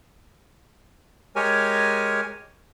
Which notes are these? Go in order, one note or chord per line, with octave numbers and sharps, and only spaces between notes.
G#3 G4 A#4 C#5 G#5